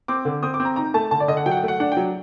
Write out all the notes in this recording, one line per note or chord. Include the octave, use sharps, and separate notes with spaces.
C4 D6
D3
C4 D#6
D6
C4
A#5
D#4 A#5
A3 A5
D3 A5
D5
D3 D#5
F#5
F#3 G5
F#5
G5
A3
F#5
D4 F#5
G5
F#3